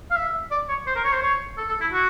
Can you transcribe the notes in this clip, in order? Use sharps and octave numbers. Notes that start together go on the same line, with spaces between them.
F5
E5
D5
C#5
C5
A#4
C#5
C5
C#5
A4
A4
E4
F#4